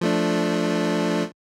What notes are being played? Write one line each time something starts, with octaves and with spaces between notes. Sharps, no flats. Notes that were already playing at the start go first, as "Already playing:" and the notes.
F3 A3 D4